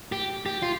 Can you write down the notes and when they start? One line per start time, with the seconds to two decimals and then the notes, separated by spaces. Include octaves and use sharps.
0.12 G4
0.46 G4
0.62 F4